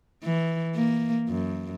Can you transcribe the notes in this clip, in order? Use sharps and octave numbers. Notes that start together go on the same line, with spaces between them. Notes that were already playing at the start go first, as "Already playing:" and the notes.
E3
A#3
F#2